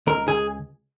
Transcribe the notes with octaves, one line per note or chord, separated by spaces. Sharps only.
C#2 A#4
C#2 G#4